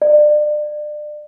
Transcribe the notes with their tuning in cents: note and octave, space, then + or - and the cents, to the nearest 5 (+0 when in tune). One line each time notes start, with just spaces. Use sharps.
D5 +30